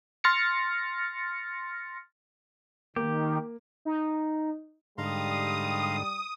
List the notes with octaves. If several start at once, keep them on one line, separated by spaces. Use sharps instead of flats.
C6 F6 A6 A#6 C#7
D#3 A#3 G4
D#4
G#2 D3 G3 F5 A#5 C6 D#6